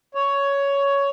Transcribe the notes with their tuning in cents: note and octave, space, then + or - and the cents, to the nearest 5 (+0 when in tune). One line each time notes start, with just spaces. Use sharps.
C#5 +10